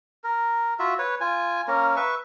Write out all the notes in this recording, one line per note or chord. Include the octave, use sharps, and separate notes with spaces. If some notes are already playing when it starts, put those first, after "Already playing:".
A#4
F4 F#4 E5
B4 C#5
F4 G#5
A#3 C#4 A#4
B4 E5 C#6